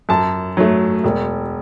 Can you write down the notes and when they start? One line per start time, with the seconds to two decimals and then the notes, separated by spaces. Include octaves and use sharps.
0.09 F#2 A5
0.57 F#3 A3
1.04 E1